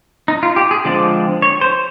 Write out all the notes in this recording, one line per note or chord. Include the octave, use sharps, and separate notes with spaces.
D#4
F4
G4
G#4
D3 F3 G#3 C4 D5
C#5
C5